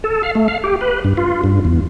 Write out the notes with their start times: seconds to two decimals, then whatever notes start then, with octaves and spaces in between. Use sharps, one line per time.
0.04 A4
0.23 F5
0.35 A3
0.48 F5
0.64 G4
0.81 B4
1.04 G2
1.17 F4
1.44 G2
1.65 E2